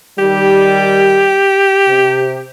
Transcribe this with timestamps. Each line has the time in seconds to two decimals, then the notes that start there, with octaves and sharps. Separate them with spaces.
0.19 D#3 G3 G4
1.88 C3